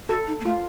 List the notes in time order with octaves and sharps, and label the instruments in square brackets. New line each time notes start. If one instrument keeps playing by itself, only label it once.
[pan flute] F#4 [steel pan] A4
[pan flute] D#4
A#3
[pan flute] A3 [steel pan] F4